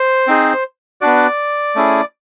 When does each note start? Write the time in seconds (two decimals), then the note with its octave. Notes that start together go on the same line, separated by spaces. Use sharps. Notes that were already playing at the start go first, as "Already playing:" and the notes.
Already playing: C5
0.27 C4 D#4 G#4
1.01 B3 D4 F#4 D5
1.75 A3 C#4 E4 G#4